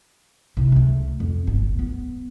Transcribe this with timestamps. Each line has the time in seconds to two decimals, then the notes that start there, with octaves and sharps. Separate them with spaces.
0.57 C3 E4
0.72 C#2 A3
1.20 F2
1.47 D1 G1
1.79 B3